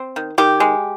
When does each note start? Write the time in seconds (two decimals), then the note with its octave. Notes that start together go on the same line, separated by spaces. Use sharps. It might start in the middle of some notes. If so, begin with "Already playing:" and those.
Already playing: C4
0.16 D#3
0.38 D#3 G4
0.60 G#3